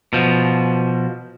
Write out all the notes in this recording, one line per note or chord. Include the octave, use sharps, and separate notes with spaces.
B2 F3